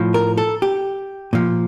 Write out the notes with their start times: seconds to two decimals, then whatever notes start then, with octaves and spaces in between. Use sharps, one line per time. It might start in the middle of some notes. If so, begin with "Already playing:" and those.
Already playing: A2 F3
0.14 A#4
0.37 A4
0.62 G4
1.33 A#2 F3